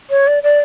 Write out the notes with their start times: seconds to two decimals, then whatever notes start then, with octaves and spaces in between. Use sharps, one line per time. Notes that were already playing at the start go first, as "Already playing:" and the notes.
0.10 C#5
0.27 D5
0.43 D5